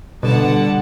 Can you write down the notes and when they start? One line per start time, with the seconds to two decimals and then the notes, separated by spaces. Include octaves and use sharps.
0.23 B2 D3 G3 F#5 A5